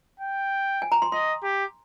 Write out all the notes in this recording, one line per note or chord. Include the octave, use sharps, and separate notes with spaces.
G5
G#5
A#5
C6
D#5 C6
G4